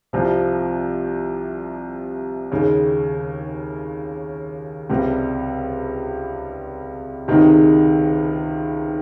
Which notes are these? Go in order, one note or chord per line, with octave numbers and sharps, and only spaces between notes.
C2 C3 F3
D#2 C#3 G#3
C#2 C3 G3
C#2 C3 D#3 G#3 D#4